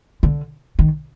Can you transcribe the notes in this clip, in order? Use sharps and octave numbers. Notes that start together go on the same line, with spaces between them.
D3
D#3